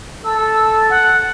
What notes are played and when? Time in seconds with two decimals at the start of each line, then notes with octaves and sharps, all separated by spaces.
0.24 A4 E6
0.90 F#5